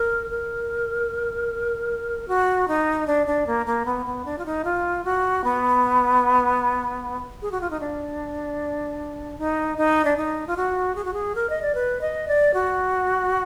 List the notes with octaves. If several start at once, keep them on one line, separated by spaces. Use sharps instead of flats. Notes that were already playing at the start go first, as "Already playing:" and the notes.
Already playing: A#4
A#4
F#4
D#4
D4
D4
A#3
A#3
B3
B3
D4
F4
D#4
F4
F#4
B3
G#4
F#4
F4
D#4
D4
D#4
D#4
D4
D#4
F4
F#4
G#4
F#4
G#4
A#4
D#5
D5
B4
D#5
D5
F#4